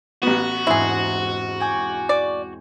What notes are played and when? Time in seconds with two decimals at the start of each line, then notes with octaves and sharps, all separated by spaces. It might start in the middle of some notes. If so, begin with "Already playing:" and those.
0.23 A1 B3 F#4
0.67 E1 G#2 C4 E4 G#4
1.60 G5 G#5 D6
2.09 D5